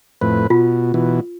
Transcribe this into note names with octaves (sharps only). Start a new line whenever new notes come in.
F2 A2 B4
B2 F4
B2 E3